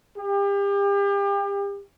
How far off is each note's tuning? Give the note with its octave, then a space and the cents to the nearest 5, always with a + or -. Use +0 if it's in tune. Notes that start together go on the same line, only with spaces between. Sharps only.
G4 +35